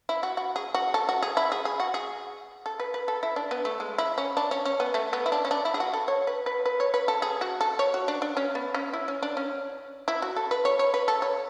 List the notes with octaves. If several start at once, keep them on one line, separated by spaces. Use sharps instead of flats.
E4
F#4
F#4
G#4
F#4
A4
F#4
G#4
E4
G#4
G#4
F#4
G#4
A4
B4
B4
A4
E4
D4
B3
A3
G#3
E4
C#4
D4
C#4
C#4
B3
A3
B3
E4
D4
C#4
D4
E4
G#4
F#4
A4
C#5
B4
B4
B4
C#5
B4
A4
G#4
F#4
A4
C#5
F#4
D4
D4
C#4
B3
C#4
E4
C#4
D4
C#4
E4
F#4
A4
B4
C#5
C#5
B4
A4
C#5